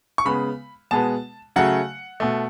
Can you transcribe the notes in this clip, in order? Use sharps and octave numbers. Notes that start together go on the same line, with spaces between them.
C#6
C#3 G#3 B3 B5
B2 G#3 B3 A5
C#3 F#3 A3 F#5
B2 A3